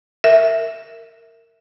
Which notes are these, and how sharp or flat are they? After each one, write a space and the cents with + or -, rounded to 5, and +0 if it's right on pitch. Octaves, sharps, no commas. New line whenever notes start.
A#4 -20 E5 +0